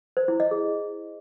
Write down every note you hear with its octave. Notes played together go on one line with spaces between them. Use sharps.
C5
E4
D#5
G#4